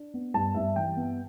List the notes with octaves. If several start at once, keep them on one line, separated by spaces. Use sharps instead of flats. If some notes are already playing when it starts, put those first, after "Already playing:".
Already playing: D4
B3
G2 A5
G2 E5
E3 G5
B3